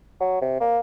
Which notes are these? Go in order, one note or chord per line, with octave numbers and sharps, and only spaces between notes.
F#3
C3
A#3